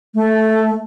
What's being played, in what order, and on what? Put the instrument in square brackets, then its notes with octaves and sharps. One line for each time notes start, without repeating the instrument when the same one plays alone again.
[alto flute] A3